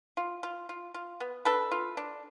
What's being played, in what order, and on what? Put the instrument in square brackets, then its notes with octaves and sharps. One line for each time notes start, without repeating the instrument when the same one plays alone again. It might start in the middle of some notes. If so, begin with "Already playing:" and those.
[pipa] F4
F4
F4
F4
B3
D4 A4 B4
F4
D4